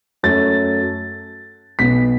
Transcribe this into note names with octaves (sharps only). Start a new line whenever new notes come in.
F#2 F#3 A3 C#4 A6
B1 B2 B3 B6